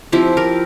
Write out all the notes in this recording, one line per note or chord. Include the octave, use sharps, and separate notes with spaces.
F3 C4 E4 G4
G4 A#4